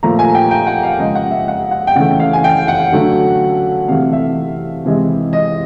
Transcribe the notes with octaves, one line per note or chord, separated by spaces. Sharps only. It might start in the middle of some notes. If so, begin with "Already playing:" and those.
A#2 F3 A3 A#5
G#5
G5
G5
F#5
F5
C#3 F3 G#3 D#5
F#5
E5
F#5
F#5
G5
C#3 E3 A3 F#5
F5
G#5
G5
F#5
D3 F#3 A3
C3 E3 A3 F5
E5
C3 E3 G#3
D#5